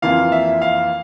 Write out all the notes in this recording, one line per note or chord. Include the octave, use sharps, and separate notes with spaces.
F2 E3 A#3 F4 F5
E5
F5